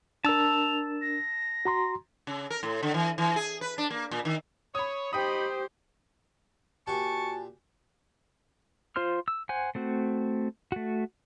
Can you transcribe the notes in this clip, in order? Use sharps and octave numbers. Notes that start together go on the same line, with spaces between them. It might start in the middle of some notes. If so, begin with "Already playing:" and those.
D4 A#4 A5 E6 F7
A#6
F#4 A#5 C6
C#3
A#4
A2
D3
E3
E3
G#4
B4
D4
A#3
A#2
D#3
C#5 B5 D#6
D#4 G4 C5 G5 B5 D#6
A#2 F#4 G4 C5 G#5 A5 C#6
F4 C5 C6 F6
E6
C5 F#5 G#5
A3 C4 F#4
A3 F#4